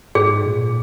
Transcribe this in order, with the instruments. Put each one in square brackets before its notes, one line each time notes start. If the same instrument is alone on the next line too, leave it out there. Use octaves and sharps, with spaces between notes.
[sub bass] G#2 [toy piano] G#4
[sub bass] A#2